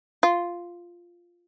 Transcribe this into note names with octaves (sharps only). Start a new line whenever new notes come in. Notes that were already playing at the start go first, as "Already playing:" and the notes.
F4